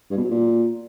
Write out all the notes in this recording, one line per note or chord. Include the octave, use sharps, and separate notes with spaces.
G2
B2
F#3
A#2